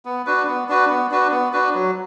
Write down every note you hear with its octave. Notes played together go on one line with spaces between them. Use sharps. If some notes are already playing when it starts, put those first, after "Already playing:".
B3
D4 F#4 B4
B3
D4 F#4 B4
B3
D4 F#4 B4
B3
D4 F#4 B4
F#3